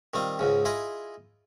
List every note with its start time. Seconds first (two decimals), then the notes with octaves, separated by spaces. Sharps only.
0.14 D#3 G3 C4 F4
0.39 C#2 G#2 C#3
0.65 E4 F4 G#4 D#5